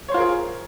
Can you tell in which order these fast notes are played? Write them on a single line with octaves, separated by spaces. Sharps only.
C#5 C5 F4 A#4 G#4